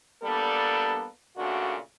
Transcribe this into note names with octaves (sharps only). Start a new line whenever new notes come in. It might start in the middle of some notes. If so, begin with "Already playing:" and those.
G3 A#3 B3 D4 A4
A#2 C#3 A3 D4 F#4